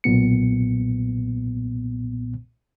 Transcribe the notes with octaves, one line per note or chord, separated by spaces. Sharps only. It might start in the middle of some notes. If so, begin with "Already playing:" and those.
B1 A#2 B3 C#7